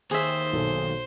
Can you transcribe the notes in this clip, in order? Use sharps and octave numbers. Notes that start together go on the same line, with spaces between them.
D#2 G#4 C5 E5
B1 A4